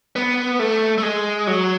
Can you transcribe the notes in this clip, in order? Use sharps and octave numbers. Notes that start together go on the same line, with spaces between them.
B3
A3
A3
G#3
F#3